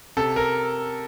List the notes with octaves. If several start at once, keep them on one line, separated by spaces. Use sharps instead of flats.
C3 A4
A#4